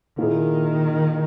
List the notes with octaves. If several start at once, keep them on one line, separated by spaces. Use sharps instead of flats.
A#2 D#3 A#3 E4 G#4